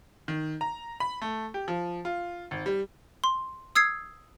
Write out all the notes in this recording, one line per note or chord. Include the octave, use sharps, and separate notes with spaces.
D#3
A#5
B5
A3
G4
F3
F4
G#1
G3
C6
D#6 E6 G#6 C7